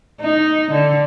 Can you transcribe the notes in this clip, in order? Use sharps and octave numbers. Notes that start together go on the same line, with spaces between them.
D#4
D3